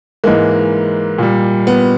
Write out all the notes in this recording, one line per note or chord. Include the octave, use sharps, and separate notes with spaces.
G#2 E3 G#3 A#3
A#2 G3
B3